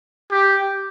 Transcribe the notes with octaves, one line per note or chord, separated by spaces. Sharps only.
G4